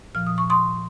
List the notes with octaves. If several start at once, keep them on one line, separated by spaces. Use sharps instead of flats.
A#2 F3 F6
D#6
C#6
C6 D#6